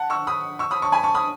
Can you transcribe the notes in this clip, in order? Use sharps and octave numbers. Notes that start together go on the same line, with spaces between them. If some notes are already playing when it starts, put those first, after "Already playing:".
Already playing: F#5 A5
C#6 E6
B5 D#6
C#6 E6
B5 D#6
A5 C#6
G#5 B5
A5 C#6
B5 D#6